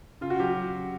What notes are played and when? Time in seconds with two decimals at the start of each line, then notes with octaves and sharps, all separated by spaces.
0.21 C#3 F4
0.30 F#4
0.40 F#3 G4